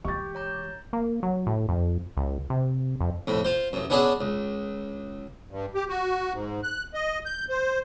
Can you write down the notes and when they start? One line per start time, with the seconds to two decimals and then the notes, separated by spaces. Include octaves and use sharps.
0.05 E3 G#3 G4 C#6 A6
0.35 C#5 A#5 G6
0.93 A#3
1.23 F#3
1.47 A2
1.69 F2
2.17 C#2
2.50 C3
3.01 F2
3.27 F2 A2
3.45 F4 C5
3.73 A1 F#2
3.90 B3 C#4 D4 F#4 G#4 E5
4.21 C#2
5.50 G2
5.75 G4
5.89 F#4
6.33 G#2
6.63 F#6
6.94 D#5
7.26 G6
7.50 C5